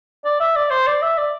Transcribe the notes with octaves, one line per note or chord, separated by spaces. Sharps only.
D5
E5
D5
C5
D5
E5
D5